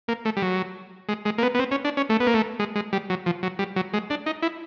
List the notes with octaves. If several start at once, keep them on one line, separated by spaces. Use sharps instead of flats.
A#3
A3
G3
F#3
G#3
G#3
A#3
B3
B3
C4
C#4
D4
C#4
A3
B3
A#3
A3
G#3
G#3
G3
F#3
F3
F#3
G3
F#3
G#3
D4
D#4
E4